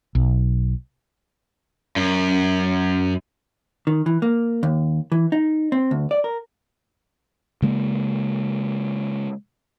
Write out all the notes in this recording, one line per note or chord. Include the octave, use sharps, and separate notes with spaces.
B1
F#2
D#3
E3
A#3
D#2
E3
D#4
C4
D2
D5
A#4
C#3 G#3 A#3